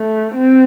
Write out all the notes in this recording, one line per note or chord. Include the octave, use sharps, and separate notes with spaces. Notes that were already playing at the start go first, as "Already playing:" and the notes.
Already playing: A3
C4